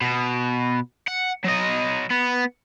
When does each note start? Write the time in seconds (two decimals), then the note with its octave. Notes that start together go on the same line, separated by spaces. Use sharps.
0.02 B2
1.08 F#5
1.45 F#3 D#5
2.11 B3